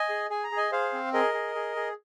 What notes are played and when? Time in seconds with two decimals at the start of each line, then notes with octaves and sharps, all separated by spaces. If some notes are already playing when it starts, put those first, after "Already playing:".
Already playing: D#5 G#5
0.09 G#4
0.30 G#4 G#5
0.44 A#5
0.51 G#4
0.57 D#5 G#5
0.72 G#4 C5 F5
0.93 C4
1.13 G#4 A#4 D#5
1.34 G#4
1.55 G#4
1.76 G#4